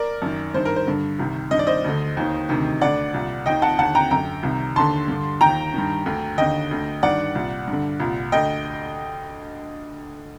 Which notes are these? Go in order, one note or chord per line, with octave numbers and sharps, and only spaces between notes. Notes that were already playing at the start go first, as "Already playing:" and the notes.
Already playing: A#4 D5
F#2 D#3
G2 D#3 C5
A#4
C5
G2 D3
C2 C3 D#3
G2 D#3 D#5
D5
C5 D#5
D2 D3
D#2 D#3
D2 C3 D#3
D2 D3 D5 F#5
C2 A#2
D#2 D#3 D#5 G5
F#5 A5
D#2 D3 F#5 A5
G5 A#5
F#2 D3 G5 A#5
C2 C3 D#3
D#2 D3 A5 C6
G2 D3
D#2 D#3 G5 A#5
G2 D#3
D2 D3
D#2 D3 D#5 G5
D2 D3
G2 D#3 D5 F#5
C2 A#2
G2
D3
C2 A#2
D2 D3 D#5 G5